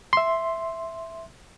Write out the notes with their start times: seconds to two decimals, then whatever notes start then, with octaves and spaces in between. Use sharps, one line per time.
0.13 E5 C6